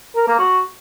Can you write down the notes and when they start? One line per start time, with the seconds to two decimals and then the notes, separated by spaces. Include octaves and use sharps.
0.16 A#4
0.27 A#3
0.39 F#4